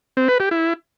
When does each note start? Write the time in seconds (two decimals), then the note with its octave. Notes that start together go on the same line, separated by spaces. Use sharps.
0.17 C4
0.28 B4
0.40 G4
0.51 E4